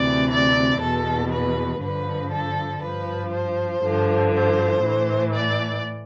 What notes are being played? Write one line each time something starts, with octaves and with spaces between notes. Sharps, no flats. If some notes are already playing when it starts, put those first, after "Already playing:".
Already playing: D2 C3 E3 D5
D5
E2 B2 A4
B4
G2 D3 F3 B4
A4
G2 F3 B4
C5
G2 D3 F3
C5
A2 E3
D5